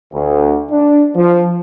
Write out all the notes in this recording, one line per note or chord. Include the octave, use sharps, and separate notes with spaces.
D2
D4
F3